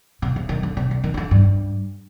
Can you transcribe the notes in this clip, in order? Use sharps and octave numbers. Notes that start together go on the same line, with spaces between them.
C3
C3
D#3
D3
C3
D3
D#3
D#3
D3
G2